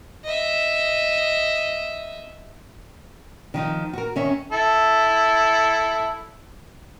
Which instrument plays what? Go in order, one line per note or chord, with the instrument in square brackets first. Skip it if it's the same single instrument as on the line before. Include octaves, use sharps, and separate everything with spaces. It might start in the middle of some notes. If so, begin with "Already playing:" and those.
[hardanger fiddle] D#5 E5
[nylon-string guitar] D#3 F3 D#4
F#4 A#4
D#3 C#4 E5
[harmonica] E4 A4